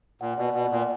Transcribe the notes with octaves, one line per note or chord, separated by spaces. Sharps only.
A#2 F#5
B2 D5
B2 F#5
A#2 D5